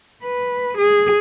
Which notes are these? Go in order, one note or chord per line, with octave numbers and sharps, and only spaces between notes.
B4
G#4